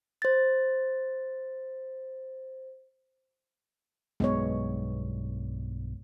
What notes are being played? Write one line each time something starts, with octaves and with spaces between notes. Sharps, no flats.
C5 A6
B1 G2 G#3 B3 C#5